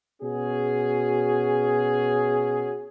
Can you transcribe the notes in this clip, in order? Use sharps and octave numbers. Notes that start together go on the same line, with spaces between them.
B2 C#4 F#4 G#4